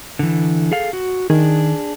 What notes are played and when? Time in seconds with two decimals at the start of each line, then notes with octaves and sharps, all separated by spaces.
0.19 D3 E3
0.72 G#4 A4 F5
0.93 F#4
1.30 D#3 D4 G#4